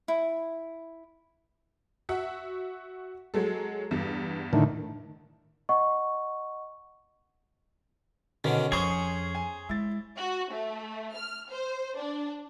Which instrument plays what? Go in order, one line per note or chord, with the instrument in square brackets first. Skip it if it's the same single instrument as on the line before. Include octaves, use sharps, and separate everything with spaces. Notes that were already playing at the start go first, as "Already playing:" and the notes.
[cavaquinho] E4
[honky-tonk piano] F#4 E5 F#5
F#3 G#3 A4
E2 G2
[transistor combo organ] A2 D3 D#3
[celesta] D#5 F#5 C#6
[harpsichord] B2 D3 D#3 [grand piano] C#4
[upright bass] F2 [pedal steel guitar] G#4 C#6 D#6 [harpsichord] C5 C#5
[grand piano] G#5
[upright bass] G#3 [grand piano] E4 A6
[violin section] F#4
A3
F6
C5
D4